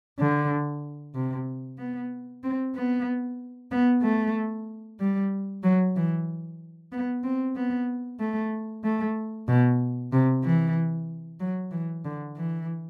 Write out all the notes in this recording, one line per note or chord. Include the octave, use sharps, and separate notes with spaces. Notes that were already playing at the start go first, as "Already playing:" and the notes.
D3
C3
B3
C4
B3
B3
A3
G3
F#3
E3
B3
C4
B3
A3
A3
B2
C3
E3
F#3
E3
D3
E3